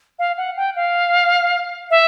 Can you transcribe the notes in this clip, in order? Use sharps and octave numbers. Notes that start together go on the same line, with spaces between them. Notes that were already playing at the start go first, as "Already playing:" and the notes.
F5
F#5
G5
F5
E5